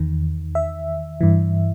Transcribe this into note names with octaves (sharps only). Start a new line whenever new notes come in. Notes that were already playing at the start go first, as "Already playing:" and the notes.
Already playing: E2 D#3
E5
G2 E3